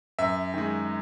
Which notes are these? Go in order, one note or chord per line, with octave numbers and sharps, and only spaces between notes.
F#2 E5
D#3 G#3